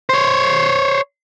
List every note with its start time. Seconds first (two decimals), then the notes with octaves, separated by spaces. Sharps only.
0.09 C5 C#5